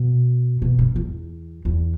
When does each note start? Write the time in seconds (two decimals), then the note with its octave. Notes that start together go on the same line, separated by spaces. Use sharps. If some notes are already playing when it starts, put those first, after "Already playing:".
Already playing: B2
0.62 B2
0.79 G2
0.96 E2
1.65 E2